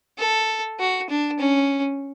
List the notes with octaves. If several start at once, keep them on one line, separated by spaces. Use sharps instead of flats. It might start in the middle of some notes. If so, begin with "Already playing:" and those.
A4
F#4
D4
C#4